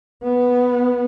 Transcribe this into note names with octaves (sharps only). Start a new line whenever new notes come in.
B3